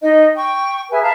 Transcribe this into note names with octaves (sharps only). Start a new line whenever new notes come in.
D#4 D#5
G5 C#6
G#4 B4 E5 G#5
E5 F5 A5 A#5